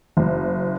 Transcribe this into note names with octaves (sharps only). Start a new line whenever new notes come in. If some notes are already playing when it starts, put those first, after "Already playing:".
F#1